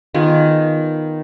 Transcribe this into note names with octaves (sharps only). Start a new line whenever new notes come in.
D#3 B3 F4 G#4